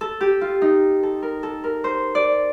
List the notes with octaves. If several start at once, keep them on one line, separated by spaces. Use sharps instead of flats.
A4
G4
F4
D#4
A4
A#4
A4
A#4
C5
D5